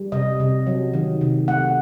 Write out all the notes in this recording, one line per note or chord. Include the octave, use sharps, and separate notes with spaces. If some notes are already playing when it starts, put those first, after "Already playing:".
Already playing: G3
C3 D#5
C3
F#3
D#3
C3
A3 F#5